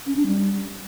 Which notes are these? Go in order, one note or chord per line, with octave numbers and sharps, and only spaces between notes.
C#4
D4
G3